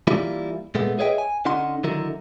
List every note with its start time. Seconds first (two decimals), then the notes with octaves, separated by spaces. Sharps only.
0.07 E3 G3 A#3 E4 F4
0.75 A#2 G#3 A3 B3
0.99 G#4 B4 C#5 D#5 E5 G5
1.18 G#5
1.45 D3 C#4 D#4 F#5 C6
1.84 D3 D#3 F#3 E4 A#4